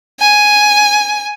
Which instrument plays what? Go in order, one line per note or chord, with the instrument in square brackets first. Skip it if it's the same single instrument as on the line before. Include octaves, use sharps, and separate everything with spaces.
[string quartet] G#5